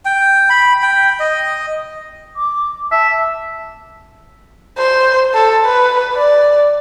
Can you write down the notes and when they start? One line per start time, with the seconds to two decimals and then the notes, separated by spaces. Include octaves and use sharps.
0.05 G5
0.50 B5
0.82 G5
1.20 D#5
2.36 D6
2.92 E5 A5
4.77 C5
5.34 A4
5.65 B4
6.13 D5